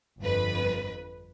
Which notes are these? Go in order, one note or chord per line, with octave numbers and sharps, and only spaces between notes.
G1 F2 B4